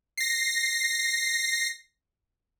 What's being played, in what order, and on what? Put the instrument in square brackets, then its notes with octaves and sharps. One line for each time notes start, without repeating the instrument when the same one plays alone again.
[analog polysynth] A#6 C7